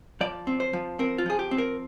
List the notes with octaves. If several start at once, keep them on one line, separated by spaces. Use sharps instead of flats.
F3 D5
C4
C5
F3
C4 A#4
F4
F3 G#4
G4
C4
A#4